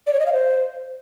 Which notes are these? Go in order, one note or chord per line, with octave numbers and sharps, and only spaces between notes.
D5
C#5
D#5
F5
C5